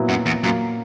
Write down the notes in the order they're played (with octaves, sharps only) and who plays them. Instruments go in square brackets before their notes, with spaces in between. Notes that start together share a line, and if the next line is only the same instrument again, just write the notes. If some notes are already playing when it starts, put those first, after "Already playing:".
Already playing: [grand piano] A#2 F#3 B3 E4
[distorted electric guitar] F#2
E2
[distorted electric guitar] F#2 [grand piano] A#2 F#3 A#3